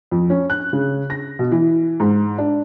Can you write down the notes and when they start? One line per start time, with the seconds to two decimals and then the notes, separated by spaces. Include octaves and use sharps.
0.11 F2
0.30 C#4
0.50 F#6
0.73 C#3
1.10 A#6
1.39 B2
1.52 E3
2.00 G#2
2.38 D4